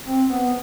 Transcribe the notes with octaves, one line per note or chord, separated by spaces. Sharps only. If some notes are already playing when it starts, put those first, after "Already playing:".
C4
B3